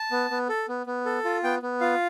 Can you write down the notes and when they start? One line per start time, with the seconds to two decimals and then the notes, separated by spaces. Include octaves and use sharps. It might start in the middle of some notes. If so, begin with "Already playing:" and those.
Already playing: A5
0.11 B3
0.31 B3
0.49 A4
0.69 B3
0.87 B3
1.06 A4
1.25 F4
1.44 B3 G5
1.63 B3
1.81 F4 F5